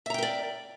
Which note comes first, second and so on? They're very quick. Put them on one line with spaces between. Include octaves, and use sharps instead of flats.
E5 A#5 G5 A#4 D5